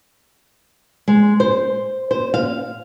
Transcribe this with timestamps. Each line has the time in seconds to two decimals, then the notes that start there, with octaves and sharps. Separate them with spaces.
1.08 G#3
1.40 C5
2.11 C5
2.34 F5